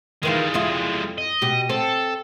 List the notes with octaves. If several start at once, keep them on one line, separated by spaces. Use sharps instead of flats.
D#3 E3 G3 G#3 F4
F2 E4 F4
D#5
B2 G4
C4 A4